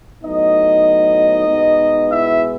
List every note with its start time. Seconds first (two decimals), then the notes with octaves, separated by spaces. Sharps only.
0.23 A2 F#3 B3 D#4 D#5
1.48 B2 G#3 B3
2.11 E4 E5